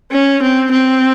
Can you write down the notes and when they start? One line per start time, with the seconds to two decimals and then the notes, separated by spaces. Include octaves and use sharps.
0.12 C#4
0.42 C4
0.71 C4